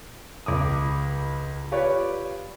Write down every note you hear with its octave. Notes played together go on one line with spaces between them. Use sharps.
C#2 D6 D#6
F4 G4 B4 C#5 D5